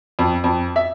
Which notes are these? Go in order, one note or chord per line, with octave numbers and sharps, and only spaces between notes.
F2
F2
E5